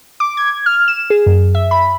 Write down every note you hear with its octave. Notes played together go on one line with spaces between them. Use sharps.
D6
G#6
F6
E7
G#4
F#2
E5
B5